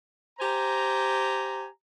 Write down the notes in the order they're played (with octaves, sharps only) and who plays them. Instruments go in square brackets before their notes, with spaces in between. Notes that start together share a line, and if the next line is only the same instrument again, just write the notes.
[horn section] G4 C5 G#5 A#5